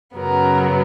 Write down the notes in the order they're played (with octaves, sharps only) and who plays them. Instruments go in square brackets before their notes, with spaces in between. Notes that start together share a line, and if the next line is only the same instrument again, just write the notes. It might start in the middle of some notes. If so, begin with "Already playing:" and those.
[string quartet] F#2 C#3 F#3 B3 A#4